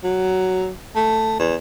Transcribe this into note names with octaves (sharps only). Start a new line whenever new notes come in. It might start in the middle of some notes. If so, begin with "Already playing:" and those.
F#3
A3
E2